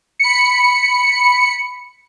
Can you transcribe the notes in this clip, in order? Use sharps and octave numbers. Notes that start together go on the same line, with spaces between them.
B5 C#7